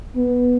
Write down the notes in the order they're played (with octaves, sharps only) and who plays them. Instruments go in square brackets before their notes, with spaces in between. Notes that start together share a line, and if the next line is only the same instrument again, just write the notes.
[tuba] B3